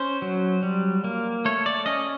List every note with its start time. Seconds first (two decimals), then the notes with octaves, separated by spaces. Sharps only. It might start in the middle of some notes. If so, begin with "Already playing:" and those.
Already playing: C#4 C5
0.22 F#3
0.63 G3
1.04 A#3
1.45 A3 C#5
1.66 D5
1.86 C#4 D#5